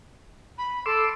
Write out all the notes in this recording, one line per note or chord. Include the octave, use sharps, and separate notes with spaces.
B5
A4 C6 D6 E6